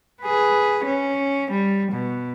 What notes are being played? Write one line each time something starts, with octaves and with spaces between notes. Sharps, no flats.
G#4 B4
C#4
G3
B2